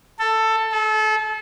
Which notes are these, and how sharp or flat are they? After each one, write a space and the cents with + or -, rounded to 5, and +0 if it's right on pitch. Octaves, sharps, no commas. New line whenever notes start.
A4 +10
A4 -30